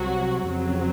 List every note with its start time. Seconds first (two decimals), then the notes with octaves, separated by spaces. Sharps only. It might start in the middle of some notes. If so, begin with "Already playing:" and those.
Already playing: C2 C3 F#3 C4 F#4
0.46 F2 C#3 F#3 C4